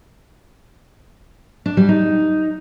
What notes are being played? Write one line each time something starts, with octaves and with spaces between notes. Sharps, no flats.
D4
G3
D#4